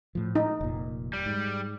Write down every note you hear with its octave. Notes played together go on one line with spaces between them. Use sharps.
A2 F3
D#4
F1 A#2
G3
G#2